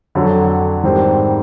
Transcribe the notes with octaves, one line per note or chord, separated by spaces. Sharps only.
F2 D3 F#3
G#2 D#3 G3 C4